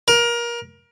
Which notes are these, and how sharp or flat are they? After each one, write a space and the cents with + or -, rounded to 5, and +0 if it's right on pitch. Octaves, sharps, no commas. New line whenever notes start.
A#4 +25